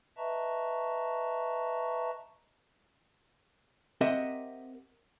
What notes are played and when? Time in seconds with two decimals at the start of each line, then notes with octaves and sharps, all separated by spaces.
0.17 B4 D#5 E5 A5 A#5 C#6
4.01 C4 G4 A#4 D#5 E5 F#5